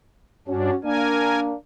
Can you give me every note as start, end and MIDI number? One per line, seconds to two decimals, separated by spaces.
0.48 0.70 43
0.48 0.76 61
0.48 0.70 62
0.48 0.76 66
0.84 1.53 58
0.84 1.53 62
0.84 1.40 70
0.84 1.40 80